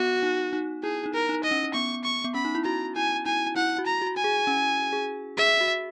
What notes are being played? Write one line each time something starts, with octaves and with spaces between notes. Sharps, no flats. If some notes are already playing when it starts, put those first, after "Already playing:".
Already playing: B3 F#4
D#4
D#4
E4 G#4
D#4
A#4
D#4
D#5
C#4
B3 C#6
C#6
B3
C#4 B5
D#4
E4
F#4 A#5
E4 G#5
E4 G#5
E4 F#5
F#4
A#5
F#4
G#5
G#4
C#4
G#4
G#4 E5
F#4